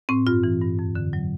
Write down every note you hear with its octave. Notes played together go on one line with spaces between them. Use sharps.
A2 C4
G2 F4
E3
G2
F2
D3
F#3